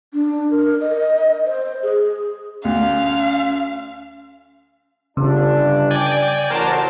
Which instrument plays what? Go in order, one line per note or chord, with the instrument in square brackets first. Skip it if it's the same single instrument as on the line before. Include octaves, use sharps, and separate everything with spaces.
[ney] D4
A#4
D#5
C5
G#4
[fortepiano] D2 [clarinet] C#4 [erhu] F5
[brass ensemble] G1 D4 [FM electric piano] C#3
[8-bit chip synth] D5 G5 G#5
[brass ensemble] A1 F#3 [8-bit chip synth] A#4 C5 A5